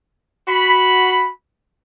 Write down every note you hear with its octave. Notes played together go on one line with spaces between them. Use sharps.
F#4 B5